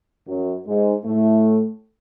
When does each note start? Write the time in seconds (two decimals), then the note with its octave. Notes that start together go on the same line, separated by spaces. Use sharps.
0.27 F#2 F#3
0.67 G#2 G#3
1.05 A2 A3